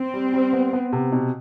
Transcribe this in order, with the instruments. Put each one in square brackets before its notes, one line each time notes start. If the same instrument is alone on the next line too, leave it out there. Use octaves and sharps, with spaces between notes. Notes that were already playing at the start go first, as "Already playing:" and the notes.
Already playing: [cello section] C4
[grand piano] G3
G3
B3
B3
C3
B2